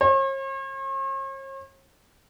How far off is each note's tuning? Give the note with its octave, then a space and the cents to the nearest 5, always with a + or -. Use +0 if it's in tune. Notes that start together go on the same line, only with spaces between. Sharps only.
C#5 -45